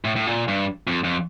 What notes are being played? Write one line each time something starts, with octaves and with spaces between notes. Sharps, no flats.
A2
A2
A#2
G2
F2
F2